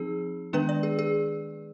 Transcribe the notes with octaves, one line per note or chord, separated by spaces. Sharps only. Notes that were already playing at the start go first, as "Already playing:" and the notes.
Already playing: F3 C4 D#4 G#4
D#3 G#3 B3 D4 B4
D5
G#4
G#4